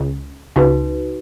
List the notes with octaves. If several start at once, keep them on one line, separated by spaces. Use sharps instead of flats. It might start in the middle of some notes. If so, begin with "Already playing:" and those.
Already playing: C#2 C#3
C#2 C#3 D#4 F#4 B4